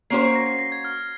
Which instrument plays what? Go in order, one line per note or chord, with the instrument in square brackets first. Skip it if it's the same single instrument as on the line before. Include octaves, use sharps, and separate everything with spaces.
[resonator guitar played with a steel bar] A#3 C#4 F#4 C5 [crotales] C7
[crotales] C7
A#6
C7
A#6
G#6
F6